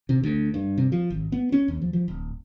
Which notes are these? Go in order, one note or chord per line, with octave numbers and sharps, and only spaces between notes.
C3
D2
G2
C3
F3
G#1
B3
C#4
D#2
F3
F3
D1